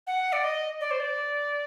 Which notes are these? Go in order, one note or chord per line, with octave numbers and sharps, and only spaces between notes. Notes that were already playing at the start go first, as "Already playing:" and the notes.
F#5
D5
D#5
D5
C5
D5